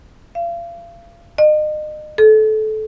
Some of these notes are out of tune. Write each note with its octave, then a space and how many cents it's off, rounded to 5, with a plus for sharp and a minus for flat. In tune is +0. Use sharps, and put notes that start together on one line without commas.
F5 -35
D#5 -35
A4 -25